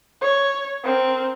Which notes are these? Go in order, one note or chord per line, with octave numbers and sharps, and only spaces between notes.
C#5
C4 A#4